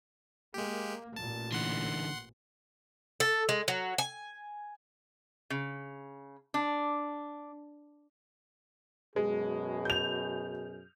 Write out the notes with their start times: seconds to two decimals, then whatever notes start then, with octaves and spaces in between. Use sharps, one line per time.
0.54 G#3 A#3 G4
1.16 A1 A#2 A5
1.52 D3 E3 F#5 C6
3.20 A4
3.49 G#3
3.68 F#3
3.98 G#5
5.50 C#3
6.54 D4
9.16 F#2 B2 G#3 G#4
9.85 G6 F7